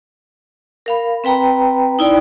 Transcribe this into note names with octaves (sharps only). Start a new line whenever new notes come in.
A#4 F5 B5
C4 B4 G5 A#5 B5
D#4 E4 D5 G5 B5